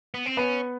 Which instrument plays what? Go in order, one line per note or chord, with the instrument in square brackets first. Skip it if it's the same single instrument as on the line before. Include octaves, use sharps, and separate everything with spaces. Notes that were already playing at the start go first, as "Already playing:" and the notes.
[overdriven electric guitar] B3
C4
[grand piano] B3 [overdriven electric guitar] C#4